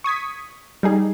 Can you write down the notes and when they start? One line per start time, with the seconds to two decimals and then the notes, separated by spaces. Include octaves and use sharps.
0.04 C#6 D#6 G#6 B6
0.83 G3 D#4 G#4